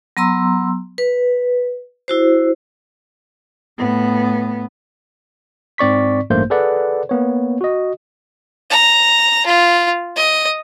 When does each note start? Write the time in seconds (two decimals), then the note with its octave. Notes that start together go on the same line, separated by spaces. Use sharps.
0.17 F#3 B3 A#5 C6 E6
0.98 B4
2.08 E4 F#4 C5
3.78 A2 B3
5.78 G#2 C4 D5 C#6 B6
6.30 A1 G2 A3 A#3 C5 G6
6.50 G#4 A4 B4 D5 F#5
7.09 A#3 B3 C#5
7.61 F#4 D#5
8.70 A#5
9.46 F4
10.17 D#5